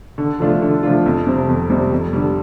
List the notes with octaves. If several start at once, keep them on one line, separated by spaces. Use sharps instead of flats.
D3
F3 A3 D4 F4
D3
F3 A3 D4 F4
F2
C3 G3 C4
F2
C3 G3 C4
F2
D3 G3